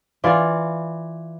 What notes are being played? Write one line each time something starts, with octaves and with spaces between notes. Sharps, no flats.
E3 F4 D5